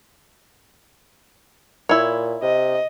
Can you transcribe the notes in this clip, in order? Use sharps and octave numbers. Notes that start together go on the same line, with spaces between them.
A#2 E4 C#5
C3 D#5